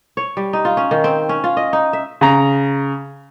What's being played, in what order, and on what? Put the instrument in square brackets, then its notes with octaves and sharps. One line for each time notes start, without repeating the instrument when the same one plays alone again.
[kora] C#5
G3
D#4
F4
C#4
D#3
C4
C#4
F4
D#5
D#4
E5
[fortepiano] C#3 A#5